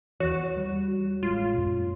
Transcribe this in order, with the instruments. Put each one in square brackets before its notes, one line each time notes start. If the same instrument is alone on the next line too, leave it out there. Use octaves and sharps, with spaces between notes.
[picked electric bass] E2 E3 [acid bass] F#4 [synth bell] C#5
[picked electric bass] G3
[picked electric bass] A1 G#3 [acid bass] F4
[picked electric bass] F#2 A#2